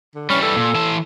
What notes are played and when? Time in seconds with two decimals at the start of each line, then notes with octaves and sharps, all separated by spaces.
0.15 D3
0.30 E3 G3 C#4
0.42 A4
0.57 A#2
0.75 E3 A5